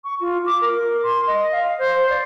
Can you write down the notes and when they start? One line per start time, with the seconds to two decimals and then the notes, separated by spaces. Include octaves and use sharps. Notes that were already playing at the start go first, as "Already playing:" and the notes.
0.04 C#6
0.21 F4
0.46 D6
0.62 A#4
1.03 C6
1.27 D#5
1.52 F5
1.79 C5
2.10 D5